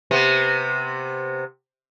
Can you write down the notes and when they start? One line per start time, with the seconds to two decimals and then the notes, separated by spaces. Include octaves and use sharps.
0.11 C3 B3